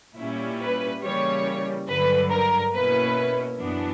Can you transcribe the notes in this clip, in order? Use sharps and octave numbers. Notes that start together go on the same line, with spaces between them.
A#2 G3 C#4 E4
B4
C#3 E3 G3 A#3 C#5
G2 D3 F#3 B4
A#4
B2 A#3 C#4 E4 B4
F#2 E3 B3 D4